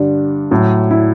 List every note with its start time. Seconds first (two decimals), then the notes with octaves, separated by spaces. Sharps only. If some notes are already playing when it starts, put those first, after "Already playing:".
Already playing: G2 D3 G3 D4
0.51 A2 F#3
0.91 E4